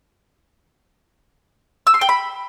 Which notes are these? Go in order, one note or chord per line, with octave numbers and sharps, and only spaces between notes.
E6
C6
G5
B5